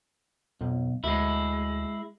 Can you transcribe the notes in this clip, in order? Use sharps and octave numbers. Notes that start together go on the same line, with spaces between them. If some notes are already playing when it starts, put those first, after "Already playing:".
B1 F2
D2 G#3 E4